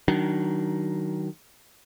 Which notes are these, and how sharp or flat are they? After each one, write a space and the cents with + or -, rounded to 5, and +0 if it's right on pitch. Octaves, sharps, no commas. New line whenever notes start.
D#3 +0 F#3 +25 D4 +0